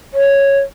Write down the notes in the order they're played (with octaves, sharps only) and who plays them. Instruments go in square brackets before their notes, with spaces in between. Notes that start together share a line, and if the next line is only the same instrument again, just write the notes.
[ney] C#5